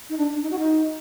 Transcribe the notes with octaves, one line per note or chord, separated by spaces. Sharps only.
D#4
D4
D4
D#4
F#4
D#4